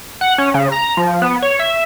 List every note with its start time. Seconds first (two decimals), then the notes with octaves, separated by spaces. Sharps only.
0.21 F#5
0.38 C#4
0.54 C#3
0.72 A#5
0.97 F3
1.22 B3
1.42 C#5
1.59 E5